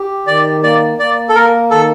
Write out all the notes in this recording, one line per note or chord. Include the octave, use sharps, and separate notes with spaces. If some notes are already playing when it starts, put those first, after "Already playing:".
Already playing: G4
D#3 D5
A#3 D5
A#3 D5
A4
A#3 A#4
D#3 A4